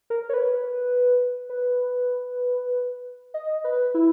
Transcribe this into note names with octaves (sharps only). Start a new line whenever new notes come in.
A#4
C#5
B4
B4
D#5
B4
E4